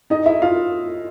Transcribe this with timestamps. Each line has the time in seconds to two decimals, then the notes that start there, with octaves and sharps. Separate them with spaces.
0.10 D#4 D#5
0.26 E4 E5
0.42 F4 F5